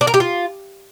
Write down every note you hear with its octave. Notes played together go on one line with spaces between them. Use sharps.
D4
A#4
G4
F4